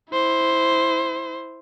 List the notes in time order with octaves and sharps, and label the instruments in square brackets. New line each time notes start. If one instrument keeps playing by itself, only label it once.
[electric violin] E4 C5